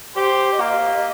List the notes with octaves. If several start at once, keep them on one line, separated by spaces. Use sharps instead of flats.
G4 C5
A#3 D#5